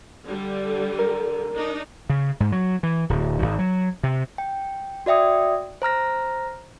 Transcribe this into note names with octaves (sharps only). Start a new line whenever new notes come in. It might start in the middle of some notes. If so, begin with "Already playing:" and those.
D3 G3
A#4
D4 D#4
C#3
G#2
F#3
E3
D1
G#1
F#3
C3
G5
F#4 D5 E5 G5 D#6
C5 A#5 F6 A#6